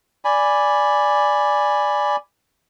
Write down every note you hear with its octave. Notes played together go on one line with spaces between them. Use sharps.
D5 G#5 B5